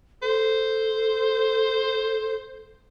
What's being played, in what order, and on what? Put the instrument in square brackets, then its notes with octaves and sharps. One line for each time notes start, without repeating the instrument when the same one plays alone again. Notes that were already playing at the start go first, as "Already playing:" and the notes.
[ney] A4 [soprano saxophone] C5